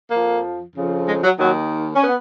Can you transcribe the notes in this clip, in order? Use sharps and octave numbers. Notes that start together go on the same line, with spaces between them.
F2 F3 A#3
F2 C#3 F3
G#3
F#3
D#2 D#3 F#3
C#4
B3